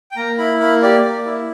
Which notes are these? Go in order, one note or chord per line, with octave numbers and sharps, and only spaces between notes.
G5
A#3 A#5
E4 B5
A#3 B5
G4 D5
A#3
E4